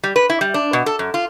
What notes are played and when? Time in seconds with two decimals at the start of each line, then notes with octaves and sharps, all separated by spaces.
0.04 G3
0.16 B4
0.30 E4
0.41 G3
0.54 D4
0.73 B2
0.86 A4
0.99 F#2
1.14 F4